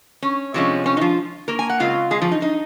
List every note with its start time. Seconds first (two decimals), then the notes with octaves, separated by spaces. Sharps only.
0.23 C#4
0.54 C3 F3 G#3 C#4
0.86 C#4
0.97 D#4
1.01 F3 F4
1.48 A#3 A#4
1.59 G#5
1.70 F#5
1.80 C#3 G#3 C4 F4 F5
2.11 G#3 G#4
2.22 F3 F4
2.31 D#4
2.42 D#4